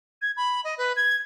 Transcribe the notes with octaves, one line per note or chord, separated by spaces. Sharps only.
G#6
B5
D#5
B4
G#6